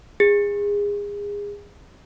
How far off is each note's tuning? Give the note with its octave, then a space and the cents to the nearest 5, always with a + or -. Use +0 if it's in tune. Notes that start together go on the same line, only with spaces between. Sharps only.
G#4 -30